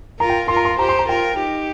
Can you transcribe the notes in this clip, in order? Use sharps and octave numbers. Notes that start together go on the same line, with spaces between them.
F4 A#4 A#5
G5
F4 A#4 C6
A#5
C6
G4 C5 A#5
C6
A#5
F4 A#4 G5
D#4 G4